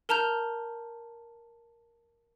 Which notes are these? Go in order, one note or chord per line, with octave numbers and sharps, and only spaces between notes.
A#4 A5 A#5 F6 G6